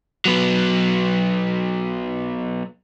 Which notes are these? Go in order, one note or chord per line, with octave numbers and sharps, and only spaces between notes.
F#3 B3